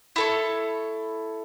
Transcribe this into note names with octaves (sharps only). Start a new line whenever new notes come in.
E4 A4 C#5